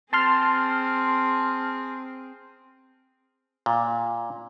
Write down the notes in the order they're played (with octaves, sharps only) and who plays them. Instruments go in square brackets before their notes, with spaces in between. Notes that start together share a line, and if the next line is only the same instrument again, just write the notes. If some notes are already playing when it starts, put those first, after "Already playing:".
[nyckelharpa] C4 G#4 [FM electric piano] A5 C6 F6
[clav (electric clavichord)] A#2